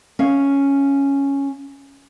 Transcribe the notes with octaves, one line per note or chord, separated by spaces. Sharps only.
C#4 F5